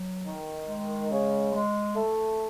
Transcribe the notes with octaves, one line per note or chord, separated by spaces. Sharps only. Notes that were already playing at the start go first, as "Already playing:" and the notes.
Already playing: F#3
D#3
G#3
C#3
G#3
A3